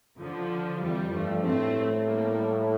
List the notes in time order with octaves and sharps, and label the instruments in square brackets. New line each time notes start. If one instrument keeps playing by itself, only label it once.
[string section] D3 F3
[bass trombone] F2 [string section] E3 G3
[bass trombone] G2 [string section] F3 A3
[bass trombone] A2 [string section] A3 C4
[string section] G3 A#3